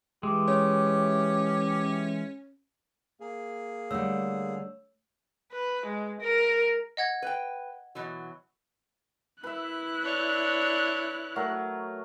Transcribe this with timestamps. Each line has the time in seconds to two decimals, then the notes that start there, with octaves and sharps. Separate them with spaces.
0.23 E3 G#3 G4
0.48 C#4 C#5
3.20 A#3 G#4
3.91 D3 G3 A3 C#5 E6
5.53 B4
5.86 G#3
6.21 A#4
6.97 D#5 F#5 G#6
7.22 B4 G5
7.95 B2 E3 F#3
9.43 E4 B4 E5 F#6
10.03 D4 C#5
11.36 F#3 A3 A#4